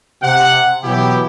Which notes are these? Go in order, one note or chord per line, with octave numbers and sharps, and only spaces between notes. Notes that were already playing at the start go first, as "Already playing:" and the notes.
C3 F#5
B2 E3 F#3 B3 E4 G4